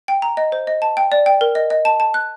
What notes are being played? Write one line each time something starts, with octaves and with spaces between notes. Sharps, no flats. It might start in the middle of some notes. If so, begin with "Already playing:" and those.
G5
A#5
D#5
C5
D#5
A5
G5
D5
G5
A#4
D#5
D#5
A5
A5
F#6